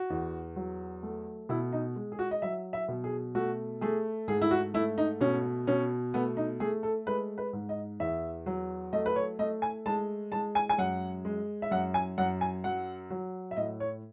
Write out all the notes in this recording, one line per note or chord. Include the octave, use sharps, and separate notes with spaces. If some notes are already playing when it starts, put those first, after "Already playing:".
Already playing: F#4
E2
F#3
A3
B2 E4
D#4
G#3
G#4
F#4
D#5
F#3 E5
E5
B2
G#4
A3 F#4
A3 G#4
G#2 G#4
E4
F#4
A3 E4
D#4
B2 C#4
B2 C#4
A3 B3
D#4
A3 G#4
A4
G#3 B4
B4
G#2
D#5
E2 E5
F#3
A3 D#5
B4
C#5
A3 D#5
G#5
G#3 A5
G#3 A5
G#5
G#5
F#2 F#5
G#3
E5
F#2 F#5
G#5
F#2 F#5
G#5
F#3 F#5
F#3
E5
A2 D#5
C#5